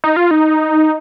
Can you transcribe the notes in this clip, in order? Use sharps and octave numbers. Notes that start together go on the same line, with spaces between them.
D#4
F4
D#4